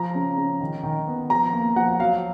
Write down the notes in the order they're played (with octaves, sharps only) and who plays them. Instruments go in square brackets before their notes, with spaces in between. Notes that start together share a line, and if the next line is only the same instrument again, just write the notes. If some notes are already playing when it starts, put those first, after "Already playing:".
Already playing: [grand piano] F3 A#5
C#3
C#3
D#3
D#3
B3
F3 A#5
A#3
F3 F#5
F#3 F5